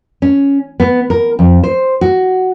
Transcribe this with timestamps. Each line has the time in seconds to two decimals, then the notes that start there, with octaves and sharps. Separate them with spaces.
0.22 C#4
0.80 B3
1.10 A#4
1.39 F2
1.64 C5
2.01 F#4